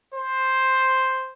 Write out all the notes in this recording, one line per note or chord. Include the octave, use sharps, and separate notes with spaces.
C5